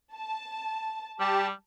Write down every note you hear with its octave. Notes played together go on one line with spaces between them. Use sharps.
A5
G3 G4 A5